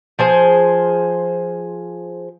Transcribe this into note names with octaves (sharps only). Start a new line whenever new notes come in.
F3 G#4 C5